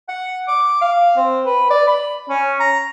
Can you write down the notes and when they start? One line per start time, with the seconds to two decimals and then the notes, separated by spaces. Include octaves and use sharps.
0.09 F#5
0.48 D6
0.81 F5
1.17 C4
1.45 B4
1.70 D5
1.87 B5
2.29 C#4
2.60 A#5